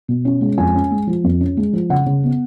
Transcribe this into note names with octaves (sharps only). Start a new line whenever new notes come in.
B2
C#4
G#3
F2 G#5
C#4
G#3
F3
F2
C#4
G#3
F3
C#3 F#5
C#3
B3